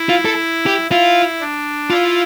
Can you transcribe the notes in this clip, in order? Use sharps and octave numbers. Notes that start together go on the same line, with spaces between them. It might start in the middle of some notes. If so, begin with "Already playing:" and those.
Already playing: E4
F4
A4
G4
E4 F4
D4
E4 F4